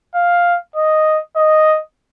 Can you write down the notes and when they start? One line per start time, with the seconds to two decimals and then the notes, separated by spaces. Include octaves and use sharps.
0.15 F5
0.76 D#5
1.36 D#5